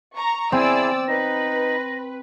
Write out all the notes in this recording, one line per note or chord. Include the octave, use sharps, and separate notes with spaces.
A#5 C#6
C4 E4 G#4 D5 G#5 E6
D#4 B4 A#6